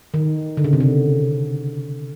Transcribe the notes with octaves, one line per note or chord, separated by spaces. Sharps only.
D#3
D3
C#3
C3
C#3